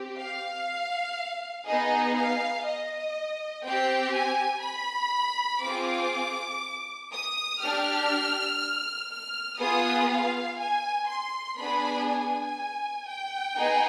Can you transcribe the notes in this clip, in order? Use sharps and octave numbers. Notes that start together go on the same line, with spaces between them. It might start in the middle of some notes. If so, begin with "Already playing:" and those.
Already playing: C4 G4
F5
B3 D#4 G#4 D#5
F5
D#5
C4 G4 G5
G#5
B5
C4 F4 G#4 D6
D#6
D4 G4 F6
F6
B3 F4 G#4 D#6
F5
G#5
C6
B3 D4 G#4 B5
G#5
G5
B3 D#4 G#4